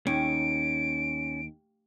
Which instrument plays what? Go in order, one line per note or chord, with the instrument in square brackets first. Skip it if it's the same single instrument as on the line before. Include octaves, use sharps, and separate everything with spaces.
[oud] D#2 [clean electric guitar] C#4 [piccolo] D7